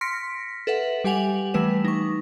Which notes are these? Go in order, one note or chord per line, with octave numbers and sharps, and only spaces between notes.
C6 F6 A#6 B6 C#7 D7
A4 B4 E5 F#5
G3 G4 F#5 G#5 F7 F#7
E3 G3 A3 B4 E7
D#4 C#6